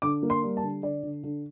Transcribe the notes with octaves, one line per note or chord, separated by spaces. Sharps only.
D3 D6
A#3
C6
G3
A5
D3
D3 D5
D3
D3